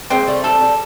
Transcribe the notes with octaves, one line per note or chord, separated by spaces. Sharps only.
G#3 A#3 C4
G3 A3
G3 A4
G3